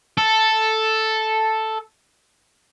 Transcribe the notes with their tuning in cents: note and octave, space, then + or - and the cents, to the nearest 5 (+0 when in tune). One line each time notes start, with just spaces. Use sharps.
A4 +0